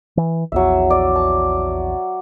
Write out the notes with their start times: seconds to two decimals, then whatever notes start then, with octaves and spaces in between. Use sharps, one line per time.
0.17 E3
0.52 A#1 E2 F#3 E5
0.90 D5
1.16 A5